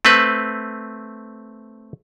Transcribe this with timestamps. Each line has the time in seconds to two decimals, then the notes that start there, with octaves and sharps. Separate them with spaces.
0.05 A3 C4 B4